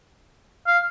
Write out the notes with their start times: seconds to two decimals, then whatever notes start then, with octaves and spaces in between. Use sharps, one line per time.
0.67 F5